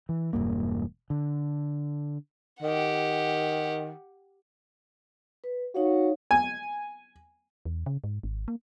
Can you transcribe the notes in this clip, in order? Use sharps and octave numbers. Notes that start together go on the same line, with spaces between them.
E3
E1 G2 A#3
D3
D#3 G4 F#5
B4
D#4 F#4 C#5 F5
G#5
E2
C#3
G#2
G#1
A#3